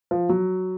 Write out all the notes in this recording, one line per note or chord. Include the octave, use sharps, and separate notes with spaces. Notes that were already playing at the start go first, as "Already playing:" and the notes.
F3
F#3